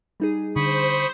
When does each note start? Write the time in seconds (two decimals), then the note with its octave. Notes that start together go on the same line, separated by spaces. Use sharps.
0.20 G3 D#4 G#4
0.56 D3 C5 B5 C#6 D#6